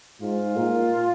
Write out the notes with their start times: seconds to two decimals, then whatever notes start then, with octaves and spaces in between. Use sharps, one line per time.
0.21 G#2 F4
0.56 A#2